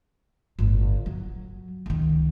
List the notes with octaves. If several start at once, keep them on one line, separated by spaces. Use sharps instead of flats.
G1 A2
F#3
C#2 D#3